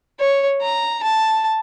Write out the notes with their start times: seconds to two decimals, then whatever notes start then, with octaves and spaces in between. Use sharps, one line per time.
0.20 C#5
0.61 A#5
1.03 A5